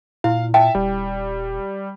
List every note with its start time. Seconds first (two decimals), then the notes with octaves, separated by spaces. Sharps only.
0.24 A#2 E4 F5
0.54 E5 G5 A5
0.75 D#1 G3